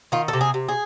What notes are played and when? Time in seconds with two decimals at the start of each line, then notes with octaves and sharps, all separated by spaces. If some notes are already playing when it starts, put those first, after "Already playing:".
0.12 D#3 F4
0.28 A4
0.33 C3
0.41 G#4
0.54 C3
0.68 G#4